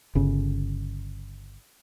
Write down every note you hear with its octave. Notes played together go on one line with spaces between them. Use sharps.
G1 C#3